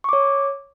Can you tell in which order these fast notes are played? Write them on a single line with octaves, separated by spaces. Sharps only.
C#6 D6 C#5